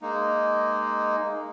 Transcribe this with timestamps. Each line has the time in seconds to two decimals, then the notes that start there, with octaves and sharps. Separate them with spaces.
0.02 G#3 A#3 D#4